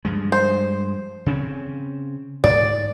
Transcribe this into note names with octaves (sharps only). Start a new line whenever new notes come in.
G2 F3 G#3
C5
C#3 C4 C#4
G#2 D5